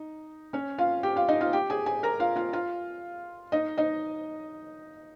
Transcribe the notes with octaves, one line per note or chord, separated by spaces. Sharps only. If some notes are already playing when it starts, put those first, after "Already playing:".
Already playing: D#4
C#4 C#5
F4 F5
G4 G5
F4 F5
D#4 D#5
F4 F5
G4 G5
G#4 G#5
G#4 G#5
A#4 A#5
F4 F5
F4 F5
F4 F5
D#4 D#5
D#4 D#5